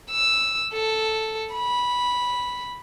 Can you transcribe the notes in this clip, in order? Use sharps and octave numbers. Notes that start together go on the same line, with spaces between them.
E6
A4
B5